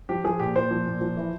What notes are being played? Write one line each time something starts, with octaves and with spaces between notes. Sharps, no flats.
F3 G4
F3 G#4
A#2 G4
A#2 C5
F3
A#2
F3
E3